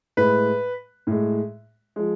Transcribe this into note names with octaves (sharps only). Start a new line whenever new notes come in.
A2 G#3 B4
A2 G#3
F3 G#3